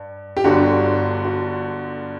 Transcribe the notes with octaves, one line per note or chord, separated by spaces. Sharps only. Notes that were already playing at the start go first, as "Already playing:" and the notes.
Already playing: G2
G4
G1 G2 D3 F#4
F#4